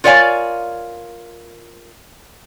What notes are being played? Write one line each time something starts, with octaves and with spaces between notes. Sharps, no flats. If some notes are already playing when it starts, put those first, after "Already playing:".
F4 A#4 C#5 D5 F5 G#5